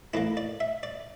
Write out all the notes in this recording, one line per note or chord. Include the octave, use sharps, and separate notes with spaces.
A2 E3 A#3 E4
D5
E5
D5